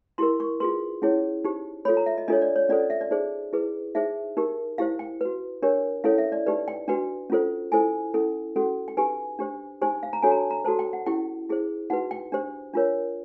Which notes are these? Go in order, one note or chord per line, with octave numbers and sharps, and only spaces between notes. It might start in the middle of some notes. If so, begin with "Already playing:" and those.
E4 G4 A#4 C6
C#6
F4 G#4 B4 C6
C#4 E4 G#4 C#5
D#4 G4 C5
F4 A4 C#5 B5
A#5
E5
D#5
D4 F4 A4 C#5 D#5
D5
C#5
C#4 F4 A4 C5 D5
D#5
E5
D5
D#4 G#4 C5 D5
E4 G#4 B4
D#4 G#4 C5 E5
D#4 G4 A#4
E4 G4 C5 F5
G5
F#4 B4
D4 G4 A#4 C#5
C#4 E4 A4 C#5 F5
E5
D5
D#4 G4 B4 D5
G5
D4 F#4 B4 G5
C#4 F4 A4 C5
E4 A4 C5 G#5
C#4 E4 A4
C#4 F#4 A4
G5
D#4 G4 B4 G#5
D4 G4 C5
D#4 G4 C5 G#5
F5
A#5
D4 F#4 A4 C#5 G#5
A#5
A5
A#5
F#4 A4 C5 A5
G5
F#5
C#4 E4 G4 G5
E4 G#4 C5
D#4 F#4 B4 F#5
G5
D4 G4 C5
D4 F4 A#4 C#5